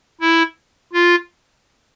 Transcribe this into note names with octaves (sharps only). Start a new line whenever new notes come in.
E4
F4